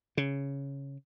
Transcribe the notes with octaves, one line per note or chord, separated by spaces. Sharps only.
C#3